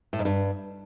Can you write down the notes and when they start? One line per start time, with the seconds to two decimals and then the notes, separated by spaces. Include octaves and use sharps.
0.13 A2
0.19 G#2
0.25 G2